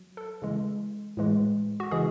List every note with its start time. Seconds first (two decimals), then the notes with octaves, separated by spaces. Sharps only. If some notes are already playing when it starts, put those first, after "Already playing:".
Already playing: F#3
0.17 A4
0.42 C#3 E3 G#3
1.17 A2 E3 G#3
1.80 F#4
1.91 C#3 E3 G#3 G#4